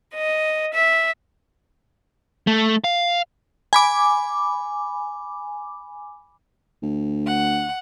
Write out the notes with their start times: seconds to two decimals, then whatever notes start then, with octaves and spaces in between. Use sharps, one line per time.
0.14 D#5
0.74 E5
2.47 A3
2.84 F5
3.73 G#5 B5 D6
6.83 D2
7.27 F#5